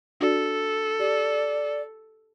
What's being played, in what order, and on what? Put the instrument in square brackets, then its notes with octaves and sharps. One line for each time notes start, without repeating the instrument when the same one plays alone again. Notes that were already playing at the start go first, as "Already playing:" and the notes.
[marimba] D4 F#4 D5 [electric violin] A4
[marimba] G4 [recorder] D5